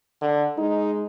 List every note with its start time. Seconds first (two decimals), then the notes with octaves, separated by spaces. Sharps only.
0.21 D3
0.58 G#3 D#4